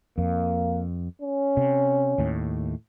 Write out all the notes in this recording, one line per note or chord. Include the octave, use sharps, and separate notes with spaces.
F2 A#3
C#4
C3
D#2 A2